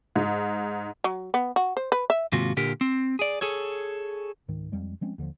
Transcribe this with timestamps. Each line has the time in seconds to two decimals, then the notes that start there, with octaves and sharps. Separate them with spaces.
0.16 G#2
1.04 F#3
1.34 B3
1.56 F#4
1.77 C5
1.92 B4
2.10 E5
2.32 D#2 G#2 C3 F4 F#4
2.57 A#2 D3 G4 A#4
2.81 C4
3.19 G#4 D5
3.41 G#4 A4 C#5
4.48 C#2 G#2 D#3
4.72 F2 G3 G#3
5.01 F3 G#3 C4 C#4
5.18 D#2 D3 D#3 F3